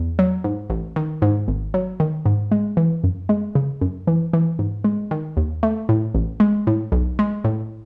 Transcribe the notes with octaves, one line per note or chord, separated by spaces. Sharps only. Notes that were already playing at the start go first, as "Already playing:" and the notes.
Already playing: E2
F#3
G#2
A1
D#3
G#2
G#1
F#3
D#3
G#2
G#3
E3
F#2
G#3
C#3
F#2
E3
E3
G#2
G#3
D#3
D#2
A3
A2
A1
G#3
A2
B1
G#3
A2